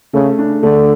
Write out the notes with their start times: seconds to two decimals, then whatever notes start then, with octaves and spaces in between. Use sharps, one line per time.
0.14 C#3 A3
0.38 D4
0.63 D3 A3